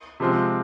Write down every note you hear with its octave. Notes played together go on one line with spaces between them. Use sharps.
C3 F3 G#3 C4 F4